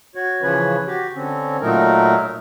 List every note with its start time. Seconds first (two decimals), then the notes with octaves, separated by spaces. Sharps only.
0.15 F#4 C#5
0.42 C#3 E3 F3 C#4 B4 C#5
0.87 F#4 G4
1.14 D3 C4 C#4
1.62 A#2 F#3 A3 D#4 A#4